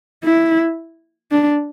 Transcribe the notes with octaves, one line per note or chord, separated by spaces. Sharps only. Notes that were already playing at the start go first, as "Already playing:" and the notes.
E4
D4